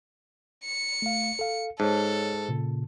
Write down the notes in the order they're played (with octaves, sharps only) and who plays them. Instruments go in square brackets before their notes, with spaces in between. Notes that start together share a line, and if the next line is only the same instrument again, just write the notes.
[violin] C#7
[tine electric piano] A3 F5
A4 F5
[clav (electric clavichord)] G#2 [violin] A4 [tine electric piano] C#5 A5
[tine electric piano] A#2 C#3